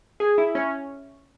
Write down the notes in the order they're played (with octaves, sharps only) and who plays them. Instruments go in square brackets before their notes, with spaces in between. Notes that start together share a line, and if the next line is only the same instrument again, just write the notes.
[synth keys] G#4
E4
C#4